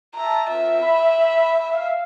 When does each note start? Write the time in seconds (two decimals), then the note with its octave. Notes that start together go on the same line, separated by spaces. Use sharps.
0.16 E5 A5 A#5
0.50 C4 F4 A#4 E5
0.83 B5
1.71 F5